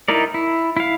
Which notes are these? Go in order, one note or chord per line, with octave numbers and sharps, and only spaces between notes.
D#4 E4 A#4 D5
E4
E4 F5